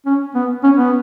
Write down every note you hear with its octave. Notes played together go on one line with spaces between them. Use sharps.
C#4
B3
C#4
B3